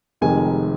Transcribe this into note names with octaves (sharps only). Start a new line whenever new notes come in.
F1 F2 C3 D#3 G#3 G#5